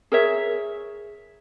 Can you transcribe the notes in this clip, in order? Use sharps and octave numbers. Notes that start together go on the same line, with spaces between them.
G#4 A#4 C#5 E5